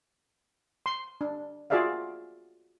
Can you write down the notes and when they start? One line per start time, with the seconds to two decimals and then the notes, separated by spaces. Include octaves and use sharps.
0.86 C6
1.21 D4
1.70 F4 F#4 G#4 D5 E5 F5